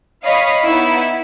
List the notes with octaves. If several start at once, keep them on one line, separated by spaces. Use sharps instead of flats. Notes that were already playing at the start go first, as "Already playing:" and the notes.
C#5 D#5 F5 B5 C#6 D#6
B3 D#4 E4 C#5